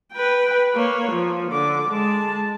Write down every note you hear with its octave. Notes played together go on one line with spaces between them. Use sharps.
B4 G5
A#3 C#5
F3
D3 D6
G#3 A5